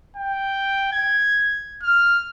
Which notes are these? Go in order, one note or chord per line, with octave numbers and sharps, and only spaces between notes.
G5
G#6
F6